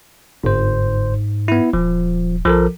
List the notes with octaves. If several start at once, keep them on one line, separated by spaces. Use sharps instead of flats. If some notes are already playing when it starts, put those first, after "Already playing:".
G1 G#2 C5
B3 E4
D#1 F3
A#1 F3 A4 A#4